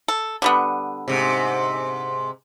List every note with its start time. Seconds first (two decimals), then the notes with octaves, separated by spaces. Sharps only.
0.08 A4
0.42 D3 G3 B3
1.08 G#2 C3